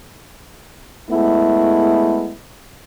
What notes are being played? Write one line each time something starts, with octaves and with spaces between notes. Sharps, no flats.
G#3 A3 B3 E4